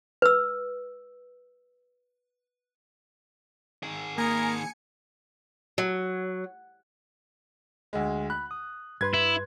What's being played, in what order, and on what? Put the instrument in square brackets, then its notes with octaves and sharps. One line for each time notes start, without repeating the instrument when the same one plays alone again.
[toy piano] B4 E6
[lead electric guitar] D#3 G#4
[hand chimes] A#3 D#6 [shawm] A#4 [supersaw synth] G#5 C#7
[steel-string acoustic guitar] F#3
[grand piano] D2 G#3
[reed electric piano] B5 [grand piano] F#6
[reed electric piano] D#6
[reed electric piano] G2 B4 C6 [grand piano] G#6
[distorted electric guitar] E4